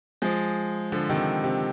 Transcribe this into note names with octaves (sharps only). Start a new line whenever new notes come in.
F3 G#3
D3 F3
C3 D#3
C3